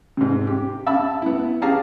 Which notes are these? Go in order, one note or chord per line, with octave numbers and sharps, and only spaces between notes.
G#2 C3
G4
E5 A5 B5 E6
B3 E4
C#4 G4 G#4 F5 A5 A#5